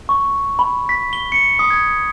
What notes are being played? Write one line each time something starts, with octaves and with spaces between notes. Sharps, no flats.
C#6
B5
B6
G7
C#7
D#6
G#6